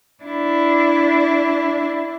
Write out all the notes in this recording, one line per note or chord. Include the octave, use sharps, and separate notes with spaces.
D4 E4